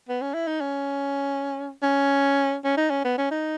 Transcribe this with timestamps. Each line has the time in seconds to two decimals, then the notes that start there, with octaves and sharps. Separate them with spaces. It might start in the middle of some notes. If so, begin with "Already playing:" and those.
0.09 B3
0.22 C#4
0.34 E4
0.48 D#4
0.61 C#4
1.83 C#4
2.65 C#4
2.78 D#4
2.91 C#4
3.05 B3
3.18 C#4
3.31 D#4